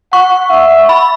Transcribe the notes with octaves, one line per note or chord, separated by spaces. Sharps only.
F#5 C#6
E5
B5